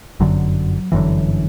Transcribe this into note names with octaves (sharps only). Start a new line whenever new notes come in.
G1 F#2 D3 F#3
G1 F#2 D3 E3